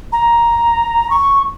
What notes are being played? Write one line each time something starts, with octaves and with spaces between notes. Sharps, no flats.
A#5
C#6